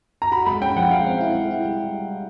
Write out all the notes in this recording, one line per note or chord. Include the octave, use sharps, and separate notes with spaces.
A#5
F#4 B5
G#3 B5
C#4 G5
F3 F#5
G#3 F5
C4
E4
G#3
E4
G3